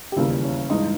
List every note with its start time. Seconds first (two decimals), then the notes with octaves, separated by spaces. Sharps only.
0.12 G4
0.16 E1 D#2 C#3 G3 A#3 E4
0.43 C#4
0.70 G2 E3 G#3 D#4